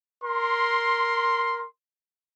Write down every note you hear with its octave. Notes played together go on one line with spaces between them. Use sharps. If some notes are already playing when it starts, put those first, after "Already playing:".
A#4 C6